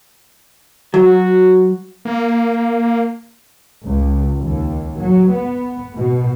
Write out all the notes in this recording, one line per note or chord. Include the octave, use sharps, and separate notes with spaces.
F#3 F#4
A#3
C#2
D#2
F#3
B3
B2